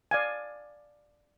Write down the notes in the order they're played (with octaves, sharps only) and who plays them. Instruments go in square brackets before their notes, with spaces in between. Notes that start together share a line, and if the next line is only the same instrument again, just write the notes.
[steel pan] D5 F5 G#5